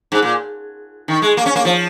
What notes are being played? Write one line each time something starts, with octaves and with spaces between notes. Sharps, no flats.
G#2
A#2
D#3
G#3
A#3
C#4
A#3
F3